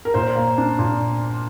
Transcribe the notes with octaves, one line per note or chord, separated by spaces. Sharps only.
A#4
A#2 C5
A#3
D4
A#2